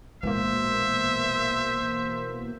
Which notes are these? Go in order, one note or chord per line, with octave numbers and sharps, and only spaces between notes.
A#1 B2 E3 G#3 A#3 C5 E5